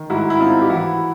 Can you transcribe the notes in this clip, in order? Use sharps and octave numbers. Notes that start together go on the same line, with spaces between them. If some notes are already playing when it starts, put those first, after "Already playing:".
Already playing: D#3
G#2 E4 F#4
E4
C4 D#4 F4
G4
E3 E4 F#4